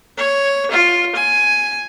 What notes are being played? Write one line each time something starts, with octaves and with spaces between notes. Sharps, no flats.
C#5
F4
G#5